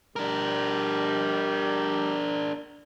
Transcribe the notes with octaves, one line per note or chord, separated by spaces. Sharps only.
G3 D4 A#4